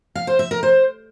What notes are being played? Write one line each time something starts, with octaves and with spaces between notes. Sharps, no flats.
F5
C5
E5
A#4
C5